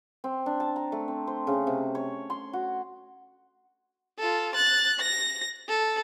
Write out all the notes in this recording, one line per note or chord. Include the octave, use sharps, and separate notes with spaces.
C4
D4
A5
A#5
A3
C4
C5
C#3
C3
C#5
C6
F#4
F4 A4
F#6 A6
A#6
A4